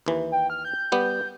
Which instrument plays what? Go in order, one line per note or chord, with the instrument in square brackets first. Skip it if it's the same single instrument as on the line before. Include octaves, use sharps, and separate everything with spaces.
[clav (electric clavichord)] D#2 E3
[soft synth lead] G5
F6
G6
[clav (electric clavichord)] G3 B3 G4